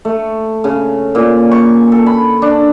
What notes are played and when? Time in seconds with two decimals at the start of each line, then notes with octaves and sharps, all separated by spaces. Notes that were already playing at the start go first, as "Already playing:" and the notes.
0.05 A3
0.64 C#3
1.15 A#2
1.51 C#6
1.92 A4
2.06 B5
2.42 D4